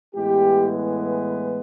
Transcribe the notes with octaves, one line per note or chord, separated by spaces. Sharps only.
A2 E3 G#3 B3 G4
B4